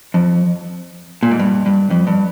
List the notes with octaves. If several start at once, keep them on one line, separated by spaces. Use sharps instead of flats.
F2
A#2
G#2
G2
G2
F2
G2